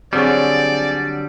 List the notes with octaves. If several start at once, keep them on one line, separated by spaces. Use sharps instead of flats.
D3 F#3 G3 C4 G#4 C#5 D5